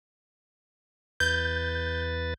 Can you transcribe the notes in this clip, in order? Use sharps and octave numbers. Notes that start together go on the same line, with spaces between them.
E2 B4 G6 A6